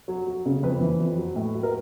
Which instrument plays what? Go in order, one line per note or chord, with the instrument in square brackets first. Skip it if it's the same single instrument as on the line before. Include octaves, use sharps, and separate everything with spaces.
[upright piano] F#3
F#3
C#3
F2 B4
E3
F2
F#3
A2
F#3
A#4